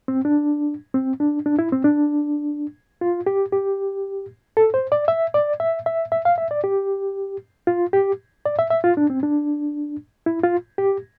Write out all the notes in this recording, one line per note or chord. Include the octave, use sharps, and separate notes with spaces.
C4
D4
C4
D4
D4
E4
C4
D4
F4
G4
G4
A4
C5
D5
E5
D5
E5
E5
E5
F5
E5
D5
G4
F4
G4
D5
E5
E5
F4
D4
C4
D4
E4
F4
G4